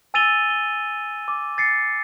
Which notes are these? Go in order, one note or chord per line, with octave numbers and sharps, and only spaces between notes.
G#5 E6 A6 D#7 F7 G7
G7
D6
A6 C7 C#7